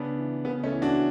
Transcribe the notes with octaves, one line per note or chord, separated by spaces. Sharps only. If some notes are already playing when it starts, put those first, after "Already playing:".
Already playing: C#3 B3 D4
E3
C#3 B3
A3 C#4
E3
D4 F#4